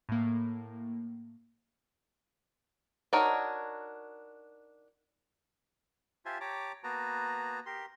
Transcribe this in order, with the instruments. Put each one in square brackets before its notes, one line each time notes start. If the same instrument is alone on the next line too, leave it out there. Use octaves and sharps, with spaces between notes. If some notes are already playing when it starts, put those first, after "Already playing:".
[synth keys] A2 A#3
[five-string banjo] D4 D#4 F#4 A#4 C#5
[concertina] F4 G4 C5 E5 G#5 A5
G4 C#5 A5 A#5 D6
A#3 B3 F#4 B4 A5 A#5
G4 A#4 C6